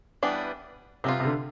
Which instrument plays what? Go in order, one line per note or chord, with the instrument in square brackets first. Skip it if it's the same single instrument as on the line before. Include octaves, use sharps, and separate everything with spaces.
[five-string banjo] E3 G3 B3 D4
[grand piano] C3 [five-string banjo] G3 B3 F4
[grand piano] C3
D3